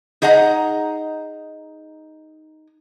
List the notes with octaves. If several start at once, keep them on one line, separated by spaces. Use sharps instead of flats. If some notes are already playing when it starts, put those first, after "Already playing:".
D#4 G#4 D#5 F#5 A#5